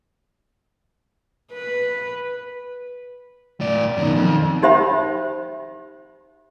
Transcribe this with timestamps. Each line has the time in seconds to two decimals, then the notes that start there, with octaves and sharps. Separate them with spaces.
1.52 B4
3.60 A2 D5
3.97 F#2 B2 D#3
4.16 F2
4.63 D#4 G4 C5 E5 G5 B5